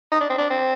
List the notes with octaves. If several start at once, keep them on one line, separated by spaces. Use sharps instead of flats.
D#4
D4
C4
D4
C4